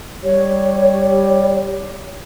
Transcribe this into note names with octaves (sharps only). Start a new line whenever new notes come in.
G3 C#5